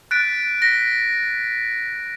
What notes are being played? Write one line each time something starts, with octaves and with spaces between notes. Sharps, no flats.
F#6 A6 B6 D7
A#6 B6